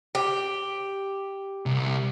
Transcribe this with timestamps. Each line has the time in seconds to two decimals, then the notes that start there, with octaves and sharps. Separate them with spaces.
0.15 G4
1.66 C2